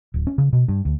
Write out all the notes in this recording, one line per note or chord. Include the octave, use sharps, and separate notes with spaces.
D1
C#4
C#3
B2
G2
D2